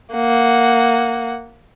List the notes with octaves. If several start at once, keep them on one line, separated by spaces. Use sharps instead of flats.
A#3 F#5